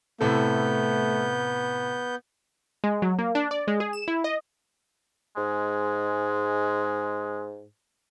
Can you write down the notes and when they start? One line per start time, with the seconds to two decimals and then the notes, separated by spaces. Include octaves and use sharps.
0.21 A2 C3 A3 B3 A4 G6
2.84 G#3
3.02 F#3
3.19 A#3
3.35 D4
3.51 D5
3.68 G#3
3.80 G#4
3.93 E7
4.08 E4
4.24 D#5
5.37 G#2 G#3